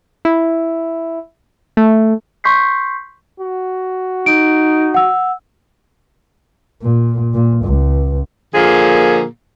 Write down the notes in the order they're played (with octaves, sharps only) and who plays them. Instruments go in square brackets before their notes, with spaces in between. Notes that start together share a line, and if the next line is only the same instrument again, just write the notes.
[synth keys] E4
A3
[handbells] C6 C#6 G6 B6 C7
[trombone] F#4
[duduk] D#4 [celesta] D7
[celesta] F#5 E6
[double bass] A#2
A#2
C#2
[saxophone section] A#2 D3 F3 A#3 G#4